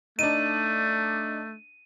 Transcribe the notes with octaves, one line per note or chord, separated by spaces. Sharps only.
A3 D4 D#4 D#7